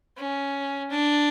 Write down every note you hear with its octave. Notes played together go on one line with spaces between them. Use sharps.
C#4
D4